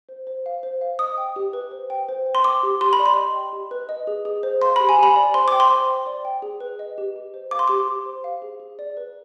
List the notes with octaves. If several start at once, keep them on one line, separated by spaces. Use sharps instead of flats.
C5
C5
F5
C5
F5
D#5 D#6
G5
G4
B4
C5
G5
C5
G5
C6
G5 D6
G4
G4 C6
B5
D5
C6
D#5
G5
G4
B4
D#5
G#4
G#4
C5
F5 C6
G4 B5
G#5
G4 B5
D5
C5 C6
G5 D6
C6
C5
G5
D5
G5
G#4
B4
D#5
G4
G4
C5
F5 D6
C6
G4 D6
G4
C5
F5
G#4
G#4
D5
B4